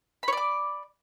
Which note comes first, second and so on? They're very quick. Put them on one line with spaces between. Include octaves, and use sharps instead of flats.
B5 C#5 D5 D6